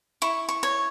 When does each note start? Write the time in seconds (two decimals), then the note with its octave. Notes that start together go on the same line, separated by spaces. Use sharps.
0.22 E4 C#6
0.49 C#6
0.63 C#5